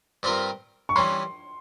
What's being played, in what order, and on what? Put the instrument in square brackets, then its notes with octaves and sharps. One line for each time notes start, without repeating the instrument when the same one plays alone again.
[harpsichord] G2 G3 C4 F4 A#4
[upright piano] C#6
[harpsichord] E3 G3 C#4 [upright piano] C6